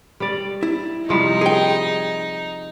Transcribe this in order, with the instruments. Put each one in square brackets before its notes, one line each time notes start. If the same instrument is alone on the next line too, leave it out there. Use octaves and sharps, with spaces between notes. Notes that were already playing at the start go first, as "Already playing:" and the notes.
[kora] G3 D5
[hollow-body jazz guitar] E4
[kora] C3 F3 G3 [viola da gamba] D#4
[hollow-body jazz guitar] G#4 G5